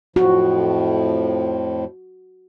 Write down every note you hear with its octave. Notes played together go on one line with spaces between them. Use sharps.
F2 A2 F3 F#4